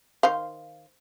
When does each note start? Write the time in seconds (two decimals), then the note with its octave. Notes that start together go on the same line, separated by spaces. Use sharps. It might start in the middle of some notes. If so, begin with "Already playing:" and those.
0.23 D#3 C5 F5